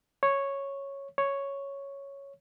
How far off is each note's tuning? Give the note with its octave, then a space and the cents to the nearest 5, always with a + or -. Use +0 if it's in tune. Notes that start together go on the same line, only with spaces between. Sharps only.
C#5 -5
C#5 +0